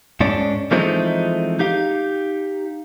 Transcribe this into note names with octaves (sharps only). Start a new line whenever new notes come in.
G#2 C#4 D4
E3 F3 G#3 A3 C4 D#4
D#4 G4 F5